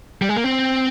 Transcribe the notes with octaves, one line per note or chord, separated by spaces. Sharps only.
G3
G#3
A#3
C4